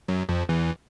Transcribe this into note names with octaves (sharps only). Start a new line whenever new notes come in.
F#2 F#3
F2 F3
E2 E3